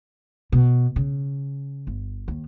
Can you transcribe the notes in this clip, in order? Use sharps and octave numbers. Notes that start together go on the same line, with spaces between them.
B2
C#3
G1
D#2